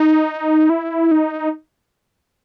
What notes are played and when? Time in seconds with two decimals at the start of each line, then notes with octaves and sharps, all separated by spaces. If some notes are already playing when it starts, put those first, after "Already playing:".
Already playing: D#4
0.70 E4
1.11 D#4